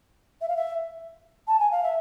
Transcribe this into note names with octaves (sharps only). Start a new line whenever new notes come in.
E5
F5
E5
A5
G#5
F5
E5